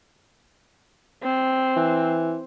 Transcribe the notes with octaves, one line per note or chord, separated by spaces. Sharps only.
C4
E3